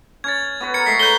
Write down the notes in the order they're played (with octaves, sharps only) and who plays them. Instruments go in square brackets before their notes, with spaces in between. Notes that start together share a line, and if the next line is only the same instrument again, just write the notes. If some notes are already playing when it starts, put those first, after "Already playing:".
[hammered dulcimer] C#4 C#5 [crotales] G#6 A6
[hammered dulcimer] B3 F#4 B4
[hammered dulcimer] A#4 [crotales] G#6 C#7
[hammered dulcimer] G#3 A3 [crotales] B6 C7
[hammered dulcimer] B4 C#5 A#5 [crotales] G6 G7